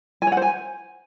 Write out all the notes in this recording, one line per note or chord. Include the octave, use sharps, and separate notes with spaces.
G#5
C#5
F#5
C5
G#5